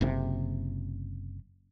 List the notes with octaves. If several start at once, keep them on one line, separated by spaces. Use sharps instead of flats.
F#1 C3